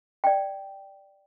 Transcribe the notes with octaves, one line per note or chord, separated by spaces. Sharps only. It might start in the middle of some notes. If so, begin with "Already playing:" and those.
D5 G5